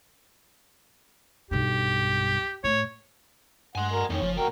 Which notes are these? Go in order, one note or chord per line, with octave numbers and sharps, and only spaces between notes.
B1 G2 G4
A2 C#5
G2 F#5 G#5 C6
F#4 A#4
F2 A2 D#3 C#4
F#1 F3
A#2 F#4 A#4 G5